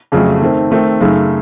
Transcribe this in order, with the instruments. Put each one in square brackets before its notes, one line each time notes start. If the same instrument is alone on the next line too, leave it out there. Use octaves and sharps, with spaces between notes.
[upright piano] F2 C#3 F#3 A3
D#3 A3 C4
D#3 A3 C4 D#4
F#2 C#3 A3 D#4